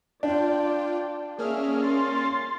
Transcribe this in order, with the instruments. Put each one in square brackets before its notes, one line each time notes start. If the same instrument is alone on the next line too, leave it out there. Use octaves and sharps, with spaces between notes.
[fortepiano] D4 [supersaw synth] F4 G5 [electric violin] D5
[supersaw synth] A#3 C#4 F6 [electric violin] G#4 E5
[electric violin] C6 A6